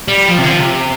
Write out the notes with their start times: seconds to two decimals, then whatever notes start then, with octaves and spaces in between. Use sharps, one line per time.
0.08 G3
0.28 F3
0.38 C3
0.44 D3
0.48 F3
0.58 C3